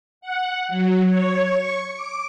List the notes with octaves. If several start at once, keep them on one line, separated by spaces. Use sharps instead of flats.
F#5
F#3
C#5
C#6
D6